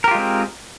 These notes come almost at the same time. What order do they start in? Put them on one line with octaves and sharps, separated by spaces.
A#4 G4 F4 G#3 C4